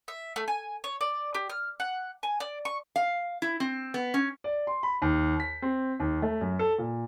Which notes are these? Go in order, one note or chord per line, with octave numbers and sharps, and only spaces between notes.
E5
A3
G#5
C#5
D5
G4
F6
F#5
G#5
D5
C#6
F5
E4
C4
B3
C#4
D5
C6
B5
D#2
B6
C4
D#2
A3
F#2
A4
A#2